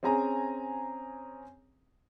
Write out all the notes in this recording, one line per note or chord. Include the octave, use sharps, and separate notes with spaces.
C4 C#4 G#4 G#5 A#5